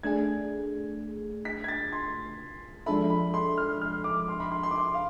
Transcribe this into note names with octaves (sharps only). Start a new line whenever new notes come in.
A3 D4 G#4 G#6
B6
G#6
A6
C6
F3 G#3 D4 A4 E5 B5
B5
C6
F6
F6
D6
C6
B5
C6
C6
D6
C6
F5